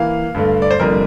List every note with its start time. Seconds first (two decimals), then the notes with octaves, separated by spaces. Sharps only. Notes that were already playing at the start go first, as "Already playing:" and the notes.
Already playing: E3 A#3 F5
0.34 G2 D3 A3
0.62 D5
0.71 C5
0.80 F1 F2 D3 G3 A#3 A#4